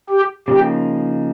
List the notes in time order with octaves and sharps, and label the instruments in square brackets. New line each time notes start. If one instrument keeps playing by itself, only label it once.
[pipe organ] G4
[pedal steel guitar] C#3 F3 A#3 D#4 [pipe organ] G4